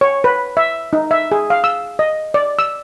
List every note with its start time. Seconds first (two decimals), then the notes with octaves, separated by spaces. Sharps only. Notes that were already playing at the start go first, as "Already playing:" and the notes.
0.01 C#5
0.24 B4
0.57 E5
0.93 D#4
1.11 E5
1.32 G#4
1.50 F5
1.64 E6
1.99 D#5
2.34 D5
2.59 E6